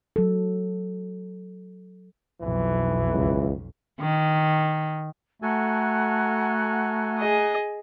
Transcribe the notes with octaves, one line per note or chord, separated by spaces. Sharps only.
F#3 A4
B1 F2 E3
C#2
D#3
A3 F#4 A4 F#5 G#5 A#5 F#6
G#4 D#5